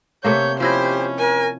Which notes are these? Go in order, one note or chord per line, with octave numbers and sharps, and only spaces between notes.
C3 A3 A#3 C#5 G6
F3 C#4 E4 G4 C5 D#5
A#4 G#5